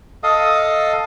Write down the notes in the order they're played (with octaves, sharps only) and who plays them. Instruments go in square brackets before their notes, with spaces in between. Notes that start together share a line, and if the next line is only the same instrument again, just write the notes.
[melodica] A4 D#5 F5 D#6